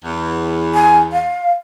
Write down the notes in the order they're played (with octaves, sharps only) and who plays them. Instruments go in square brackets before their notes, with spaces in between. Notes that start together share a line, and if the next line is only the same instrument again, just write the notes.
[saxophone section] E2
[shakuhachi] G#5
F5